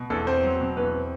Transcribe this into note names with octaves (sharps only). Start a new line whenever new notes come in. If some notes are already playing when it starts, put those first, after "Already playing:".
Already playing: B2
E2 A4
C4 C5
F#3
B2
E2 B4
C4